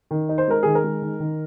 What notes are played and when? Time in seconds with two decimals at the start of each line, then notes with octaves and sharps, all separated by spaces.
0.11 D#3
0.29 D#4
0.38 C5
0.48 G#3 A#4
0.63 D#3 G#4
0.75 A#4
0.84 G#3
1.02 D#3
1.20 D#3